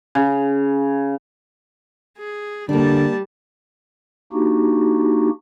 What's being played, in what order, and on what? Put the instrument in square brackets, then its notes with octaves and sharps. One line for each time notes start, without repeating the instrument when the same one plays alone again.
[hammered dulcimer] C#3
[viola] G#4
[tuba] D3 [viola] G3 A5 [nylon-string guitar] A#3 D4
[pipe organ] A#3 D4 D#4 F#4 G4